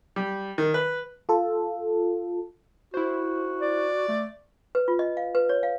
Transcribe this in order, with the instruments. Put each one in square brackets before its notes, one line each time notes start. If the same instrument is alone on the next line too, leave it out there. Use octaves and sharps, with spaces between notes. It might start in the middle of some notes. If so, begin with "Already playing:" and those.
[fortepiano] G3
D#3
B4
[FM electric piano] F4 A4
[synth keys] E4 C5 [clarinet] F#4
[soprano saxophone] D5
[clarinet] A3
[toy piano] B4
F4
D#5
F5
B4
C#5
F5